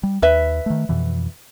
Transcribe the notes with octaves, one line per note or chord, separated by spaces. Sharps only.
G3
D#2 B4 E5
D#3 A3
F2 B2 E3